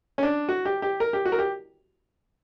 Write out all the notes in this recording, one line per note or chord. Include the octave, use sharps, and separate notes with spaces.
C#4
D4
F#4
G4
G4
A#4
G4
F#4
A#4
G4